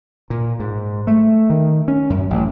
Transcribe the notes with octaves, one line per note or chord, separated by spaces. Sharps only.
A#2
G#2
A3
D#3
C#4
F#2
A1